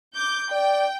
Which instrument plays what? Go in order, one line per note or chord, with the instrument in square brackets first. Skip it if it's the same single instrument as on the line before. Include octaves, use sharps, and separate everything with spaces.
[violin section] D6 G6
[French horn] D5 [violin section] G5